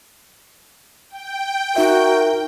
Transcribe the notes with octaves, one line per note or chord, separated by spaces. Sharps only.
G5
D#4 F#4 A#4 E5